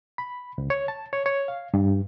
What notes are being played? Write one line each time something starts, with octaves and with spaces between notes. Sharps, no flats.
B5
C#2
C#5
A5
C#5
C#5
F5
G2